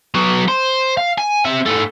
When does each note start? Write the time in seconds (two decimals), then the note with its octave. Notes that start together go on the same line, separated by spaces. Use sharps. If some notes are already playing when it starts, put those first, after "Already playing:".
0.15 F#3 B3
0.48 C5
0.97 F5
1.18 G#5
1.45 C4 E5
1.66 G#2 A3